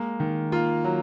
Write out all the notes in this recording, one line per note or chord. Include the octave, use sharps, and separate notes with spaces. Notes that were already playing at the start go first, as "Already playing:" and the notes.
Already playing: G#3 A#3
D#3
A#3 F4
F#3